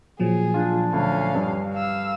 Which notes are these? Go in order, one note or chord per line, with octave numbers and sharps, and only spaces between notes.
A#2 F3 F#3 G#4
D4 F4
D2 C#4 F5
G2
F5 E6